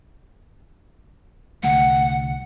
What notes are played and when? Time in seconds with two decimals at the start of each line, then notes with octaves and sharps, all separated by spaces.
1.63 C2 D3 A3 F#5